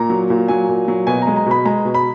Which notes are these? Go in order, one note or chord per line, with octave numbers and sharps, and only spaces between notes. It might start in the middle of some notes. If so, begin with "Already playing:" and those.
Already playing: A#2 A#5
F#3
A#2
F#3 G#5
A#2
F#3
B2 G#5
A#5
G#3
A#5
B2 B5
G#3 A#5
B2
B5